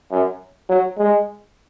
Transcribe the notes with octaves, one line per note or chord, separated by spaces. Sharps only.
F#2
F#3
G#3